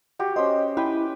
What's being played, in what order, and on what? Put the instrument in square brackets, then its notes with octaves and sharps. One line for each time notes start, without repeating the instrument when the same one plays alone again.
[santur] F#4 G4
[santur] C#4 C5 [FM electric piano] D#5
[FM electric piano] E4 [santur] B4 G5